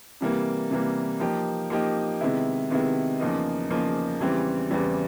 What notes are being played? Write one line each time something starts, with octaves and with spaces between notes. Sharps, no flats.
C3 E3 G3 A#3
C3 E3 G3 A#3
F3 A#3 D#4 G4
F3 A#3 D#4 G4
C3 D#3 G#3 B3 E4
C3 D#3 G#3 B3 E4
E2 C#3 F3 A#3 D#4
E2 C#3 F3 A#3 D#4
E2 C#3 E3 G3 C4
E2 C#3 E3 G3 C4